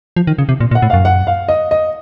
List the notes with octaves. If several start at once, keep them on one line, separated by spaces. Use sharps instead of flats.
F3
D#3
C#3
C3
A#2
A#2
F#5
A2
F#2 F5
F#5
F5
D#5
D#5